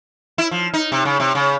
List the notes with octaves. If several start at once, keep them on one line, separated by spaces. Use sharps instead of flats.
E4
F3
D#4
C3
C#3
C3
C#3